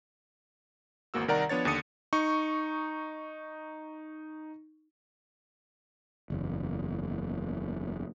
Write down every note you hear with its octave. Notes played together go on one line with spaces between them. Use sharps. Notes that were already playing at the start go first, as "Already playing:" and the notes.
G#1 E2 A#3 F#4 E6
C2 D#3 A#4 D5 F#5 A#5
F3 B3 D4 C#5 A6
D#2 D3 D4 D#6 C#7 D#7
D#4 C#6
F#1 E2